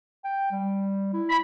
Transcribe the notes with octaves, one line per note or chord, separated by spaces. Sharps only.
G5
G3
E4
B5